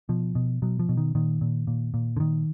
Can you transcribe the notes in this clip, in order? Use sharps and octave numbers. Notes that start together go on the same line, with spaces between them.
B2 F3
B2
B2 F#3
F3
B2
D#3
A#2 D#3
A#2
A#2
A#2
D3
A#2 D#3